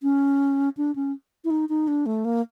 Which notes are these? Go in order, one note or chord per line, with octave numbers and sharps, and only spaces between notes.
C#4
D4
C#4
E4
D#4
D#4
D4
A3
A#3